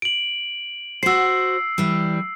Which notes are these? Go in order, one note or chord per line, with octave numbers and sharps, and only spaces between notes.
D7 F#7
F#4 C5 E6 C7
E3 G3